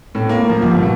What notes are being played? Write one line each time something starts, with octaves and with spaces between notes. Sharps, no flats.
A2
A#3
F3
G1
B2